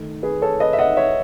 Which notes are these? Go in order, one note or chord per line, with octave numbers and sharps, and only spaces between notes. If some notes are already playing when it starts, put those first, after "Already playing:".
Already playing: D#3 A3 D#4
G#4 B4
A4 C#5
B4 D#5
E5
D#5 F#5
C#5 E5